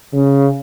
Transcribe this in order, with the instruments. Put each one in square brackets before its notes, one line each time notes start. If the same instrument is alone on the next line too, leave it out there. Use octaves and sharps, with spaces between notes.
[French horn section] C#3